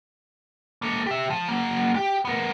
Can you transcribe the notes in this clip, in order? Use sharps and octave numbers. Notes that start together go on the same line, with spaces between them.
A#3 A4
G4 E5
F3
F#3 A#3
G4
B3 A#4